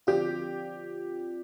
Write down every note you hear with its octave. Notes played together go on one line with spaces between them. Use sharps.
D3 F3 C4 F4 G4 D5